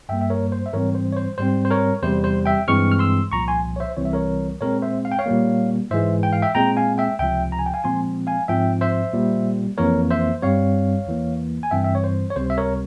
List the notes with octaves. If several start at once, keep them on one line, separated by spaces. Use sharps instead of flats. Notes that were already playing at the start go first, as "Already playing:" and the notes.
G2 G3 A#3 E5 G5
E5
A#4 C#5
C5
E5
G#2 E3 G3 C4 A#4 C#5
C5
C#5
C5
G#2 G3 C4 C5
C5
A#4 C#5
E2 C3 G3 C4 C5
C5
E5 G5
G2 E3 G#3 C4 C#6 F6
F6
C6 E6
C2 A#2 F3 A#5 C#6
G#5 C6
C#5
C5 E5
C2 C3 E3 G3 C4 C#5
E5
A#4 C#5
A#2 G#3 C4 A#4 C#5
C5 E5
F5
G5
C#5 F5
A#2 G3 A#3
G#2 E3 G#3 C5 E5
G5
F5
E5 G5
A#2 G#3 C4 G5 A#5
F5 G#5
E5 G5
C#2 C3 F3 E5 G5
A#5
G#5
G5
F5 G#5
A#2 F3 G#3 C4 G#5 C6
F5 G#5
G#2 F3 C4 E5 G5
C5 E5
A#2 G3 A#3
F2 E3 A#3 A#4 C#5
C5 E5
G2 G3 C4 C#5 F5
E2 E3 A#3
G#5
G2 E3 G3 C4 E5 G5
E5
C#5
C5
C#5
C#2 C3 G3 C5
E5
A#4 C#5